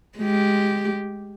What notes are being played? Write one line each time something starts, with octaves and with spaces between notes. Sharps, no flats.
G#3 G4